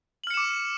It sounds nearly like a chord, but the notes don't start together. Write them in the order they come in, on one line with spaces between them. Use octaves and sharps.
F#7 F6 C#7 E7 D6